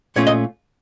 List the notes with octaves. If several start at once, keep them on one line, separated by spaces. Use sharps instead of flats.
A#2 A3 C#4 F4 C#5
D#5